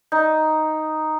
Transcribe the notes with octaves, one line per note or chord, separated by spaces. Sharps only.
D#4